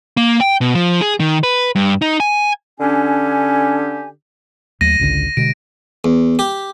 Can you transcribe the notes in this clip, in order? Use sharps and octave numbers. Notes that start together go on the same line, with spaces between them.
A#3
G5
B2
F3
G#4
D#3
B4
G2
D#4
G#5
D3 C#4 D4 G4 G#5
D#2 F#3 A3 A#6 D#7
G#1 C#2 D3
B2 D3 G#3 D7
E2
G4